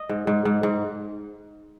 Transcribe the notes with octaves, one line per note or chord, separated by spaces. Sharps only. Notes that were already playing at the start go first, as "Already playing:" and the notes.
Already playing: D#5
G#2
G#2
G#2
G#2